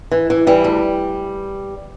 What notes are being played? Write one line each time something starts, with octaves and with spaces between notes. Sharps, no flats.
E3
E3
E3 G3
D2